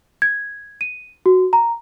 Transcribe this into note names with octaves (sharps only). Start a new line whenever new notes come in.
G#6
D#7
F#4
A#5